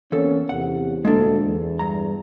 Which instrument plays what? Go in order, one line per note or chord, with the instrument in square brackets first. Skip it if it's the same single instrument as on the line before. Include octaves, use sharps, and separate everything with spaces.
[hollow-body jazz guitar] E2 A4 [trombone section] A#3 C4 C#4
[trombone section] E2 C3 [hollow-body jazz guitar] F#5
[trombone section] D2 A#2 A4 [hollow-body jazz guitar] G#3 A#3 D4
[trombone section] E2
[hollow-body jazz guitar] G2 A#5